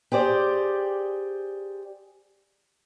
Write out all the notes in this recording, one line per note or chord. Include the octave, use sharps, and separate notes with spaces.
G4 G#4 C5 D5